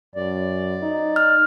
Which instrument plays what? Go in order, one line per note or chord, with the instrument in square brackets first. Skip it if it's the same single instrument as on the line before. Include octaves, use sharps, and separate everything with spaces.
[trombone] F#2 [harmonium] D5
[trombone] D#4
[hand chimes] F6